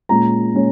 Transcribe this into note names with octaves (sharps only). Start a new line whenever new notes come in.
A#2 G#3 C#4 A#5
A#2 G#3 C#4